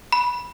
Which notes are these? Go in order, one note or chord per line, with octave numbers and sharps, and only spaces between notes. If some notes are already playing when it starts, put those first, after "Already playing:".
B5